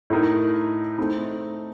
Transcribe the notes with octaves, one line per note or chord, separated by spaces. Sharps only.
A2 A3 D#4 A#4
A3 C4 D#4